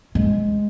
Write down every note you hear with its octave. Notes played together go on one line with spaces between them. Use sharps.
G#3